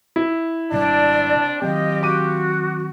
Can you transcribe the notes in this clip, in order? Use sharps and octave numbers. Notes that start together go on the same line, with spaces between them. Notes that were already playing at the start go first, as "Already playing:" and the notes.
E4
G#1 C3 G3 C4 D4 D5
D#3 F#3 C4 F4 G4 D#5
F#4 D6 D#7